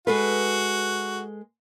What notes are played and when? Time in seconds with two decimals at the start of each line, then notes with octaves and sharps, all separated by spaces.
0.07 G#3 F#4 A4 B4